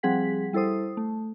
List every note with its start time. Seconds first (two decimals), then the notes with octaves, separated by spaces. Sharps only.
0.03 F3 G3 C4 G#4 F#5 B6
0.53 G3 E4 A4 C5 D#6
0.97 A3